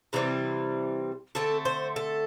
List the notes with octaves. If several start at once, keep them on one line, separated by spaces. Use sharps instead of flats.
C3 E3 G3 C4 E4
D3 A3 C4 A4
C5
A4